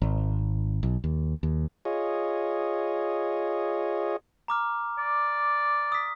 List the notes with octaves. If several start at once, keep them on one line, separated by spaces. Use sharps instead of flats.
G#1
B1
D#2
D#2
F4 G#4 C#5 D#5
A#5 D6 F6
D5
D#6 B6